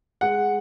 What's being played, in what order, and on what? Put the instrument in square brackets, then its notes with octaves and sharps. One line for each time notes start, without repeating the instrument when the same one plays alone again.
[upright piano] G#3 F#5